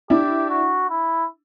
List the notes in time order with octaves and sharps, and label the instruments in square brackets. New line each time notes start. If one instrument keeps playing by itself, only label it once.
[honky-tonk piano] D4 E4 [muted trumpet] G4
[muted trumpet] F#4
E4